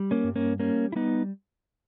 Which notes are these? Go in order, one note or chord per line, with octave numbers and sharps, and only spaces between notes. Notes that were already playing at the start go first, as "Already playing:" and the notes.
Already playing: G3
A#3 C#4
G2
A#3 C#4
G3 A#3 C#4
E4
G3 B3 D#4